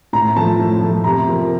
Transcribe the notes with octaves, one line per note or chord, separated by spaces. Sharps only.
A2 A#5
F3 A3 A5
A2
F3 A3
C3 A#5
F3 A#3